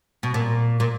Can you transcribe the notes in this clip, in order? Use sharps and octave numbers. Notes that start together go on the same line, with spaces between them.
B2
A#2
A#2